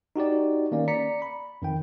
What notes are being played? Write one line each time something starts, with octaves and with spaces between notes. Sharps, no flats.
D#4 F#4 G4 D5
D#3 A#3 C#4 D5
D5 A#5 B6 C#7
B5
F2 D#3 G5